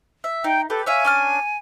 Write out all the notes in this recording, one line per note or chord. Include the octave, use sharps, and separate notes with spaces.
E5
D#4 G5
G4 A4 B4
C#5 E5 F5 G#5
C#4 D4 F6